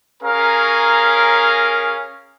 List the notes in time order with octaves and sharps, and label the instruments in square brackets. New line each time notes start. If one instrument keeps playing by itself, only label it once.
[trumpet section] C#4 G#4 A#4 F5 A#5